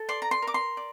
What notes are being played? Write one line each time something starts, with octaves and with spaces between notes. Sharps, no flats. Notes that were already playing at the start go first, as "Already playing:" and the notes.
Already playing: A4
D5 C6
A#5
C6
A#4
D6
C6
D5